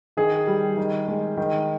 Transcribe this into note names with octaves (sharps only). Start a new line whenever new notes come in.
D#3 G#4
G3
D#3
G#3
D#3